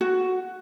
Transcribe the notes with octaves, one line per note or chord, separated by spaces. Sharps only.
F#4